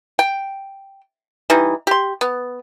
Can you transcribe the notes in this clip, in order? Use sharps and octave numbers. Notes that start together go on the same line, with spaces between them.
G5
E3 G3 D#4
G4 C6
B3